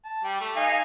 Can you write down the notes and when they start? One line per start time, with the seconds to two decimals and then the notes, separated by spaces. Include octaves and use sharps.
0.05 A5
0.24 G3 G5
0.40 A3
0.56 D#4 F5 G#5